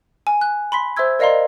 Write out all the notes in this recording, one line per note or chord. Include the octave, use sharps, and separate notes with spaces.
G#5
F#6
B5 C6 B6
C5 E5 C6 E6 G#6
A#4 D5 D#5 F5 A#5 C6